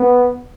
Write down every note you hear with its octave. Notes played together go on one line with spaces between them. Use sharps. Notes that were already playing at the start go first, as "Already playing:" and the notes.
Already playing: B3